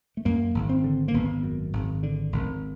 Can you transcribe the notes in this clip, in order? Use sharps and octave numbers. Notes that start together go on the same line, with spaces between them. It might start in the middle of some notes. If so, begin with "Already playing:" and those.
A3
F#2 A#3
G#1
C4
D3
A#3
G#1 B3
F#2
G#1
D3
G#1